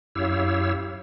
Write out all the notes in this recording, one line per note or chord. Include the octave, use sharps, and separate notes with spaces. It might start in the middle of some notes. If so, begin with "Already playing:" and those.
F#2 E4 G4 C#5 F5 E6